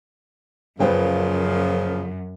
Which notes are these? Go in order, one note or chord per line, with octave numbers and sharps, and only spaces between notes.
F#2 A#2 C#3 F3 B4 C5 G5